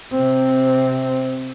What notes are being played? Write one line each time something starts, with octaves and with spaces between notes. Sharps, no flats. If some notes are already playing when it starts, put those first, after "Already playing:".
C3 C4